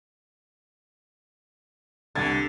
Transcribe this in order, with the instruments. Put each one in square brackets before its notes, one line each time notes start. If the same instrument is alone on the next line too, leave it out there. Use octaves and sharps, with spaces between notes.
[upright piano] C2 G#6 A6 [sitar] D3